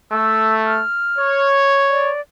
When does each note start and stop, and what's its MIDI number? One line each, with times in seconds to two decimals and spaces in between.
0.12 0.82 57
0.12 0.54 88
0.66 1.47 89
1.17 2.11 73
1.89 2.20 74